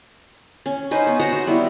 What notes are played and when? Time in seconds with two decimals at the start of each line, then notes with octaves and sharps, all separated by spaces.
0.66 C#4
0.91 C#4 D#4 B4 C5
1.07 B3
1.20 F#4 C5 F#5 A#5
1.33 F#4
1.47 G3 B3 E4